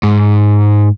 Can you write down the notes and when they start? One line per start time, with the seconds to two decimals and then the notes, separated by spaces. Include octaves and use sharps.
0.03 G#2